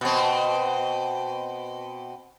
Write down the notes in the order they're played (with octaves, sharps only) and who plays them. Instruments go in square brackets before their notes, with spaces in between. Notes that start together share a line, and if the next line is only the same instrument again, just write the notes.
[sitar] B2 C4